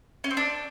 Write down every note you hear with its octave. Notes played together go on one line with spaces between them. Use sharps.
C#4
C4
D4